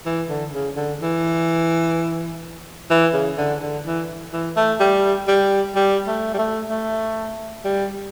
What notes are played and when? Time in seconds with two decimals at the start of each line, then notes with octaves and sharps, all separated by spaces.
0.06 E3
0.29 D3
0.53 C#3
0.76 D3
1.01 E3
2.91 E3
3.14 C#3
3.38 D3
3.62 D3
3.86 E3
4.33 E3
4.57 A3
4.80 G3
5.28 G3
5.76 G3
6.08 A3
6.34 G3
6.39 A3
6.70 A3
7.65 G3